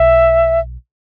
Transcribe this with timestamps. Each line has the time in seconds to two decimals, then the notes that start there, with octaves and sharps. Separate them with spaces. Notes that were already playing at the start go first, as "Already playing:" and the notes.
Already playing: B1 E5